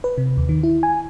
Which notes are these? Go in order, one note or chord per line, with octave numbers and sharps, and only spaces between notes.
B4
C3
D#2
D#3
E4
G#5